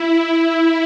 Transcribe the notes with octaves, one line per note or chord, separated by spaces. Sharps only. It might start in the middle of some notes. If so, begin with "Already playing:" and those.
Already playing: E4